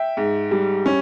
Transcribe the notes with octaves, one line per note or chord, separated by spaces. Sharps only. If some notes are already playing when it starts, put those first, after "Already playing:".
Already playing: E5 G5
G#2
G3
C#4